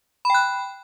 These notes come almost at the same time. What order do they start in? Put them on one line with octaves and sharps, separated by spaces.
B5 G5 F#6